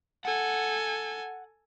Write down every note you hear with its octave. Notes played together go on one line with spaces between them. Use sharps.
A4 F#5 G#5